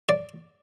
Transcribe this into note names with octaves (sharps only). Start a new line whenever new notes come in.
D5